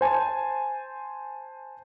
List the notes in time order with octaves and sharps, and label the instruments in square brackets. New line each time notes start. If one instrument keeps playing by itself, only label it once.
[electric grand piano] C5 G#5 A5